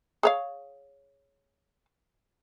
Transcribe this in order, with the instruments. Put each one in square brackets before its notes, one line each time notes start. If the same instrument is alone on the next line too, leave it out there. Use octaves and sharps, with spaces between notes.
[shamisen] G#4 C#5 F5